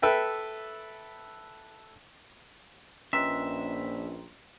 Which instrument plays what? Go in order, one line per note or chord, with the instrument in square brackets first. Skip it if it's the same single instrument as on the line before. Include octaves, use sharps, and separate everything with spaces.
[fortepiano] A4 B4 E5 G5
[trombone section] A#1 [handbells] C#4 B4 D#5 [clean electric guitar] E5 [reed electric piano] G5 A#5 C6